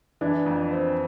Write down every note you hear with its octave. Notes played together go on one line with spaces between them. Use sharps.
E3 D4
F2
C4